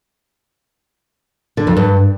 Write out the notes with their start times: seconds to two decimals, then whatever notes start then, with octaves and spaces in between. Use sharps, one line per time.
1.57 D3
1.67 F2
1.77 G2